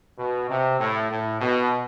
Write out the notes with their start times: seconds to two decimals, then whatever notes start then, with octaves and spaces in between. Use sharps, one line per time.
0.18 B2
0.49 C3
0.79 A2
1.10 A2
1.41 B2